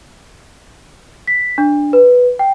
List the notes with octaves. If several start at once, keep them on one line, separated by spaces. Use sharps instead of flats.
B6
D4
B4
G5